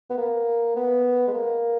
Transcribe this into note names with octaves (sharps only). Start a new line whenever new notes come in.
B3
A#3
B3
G#3
A#3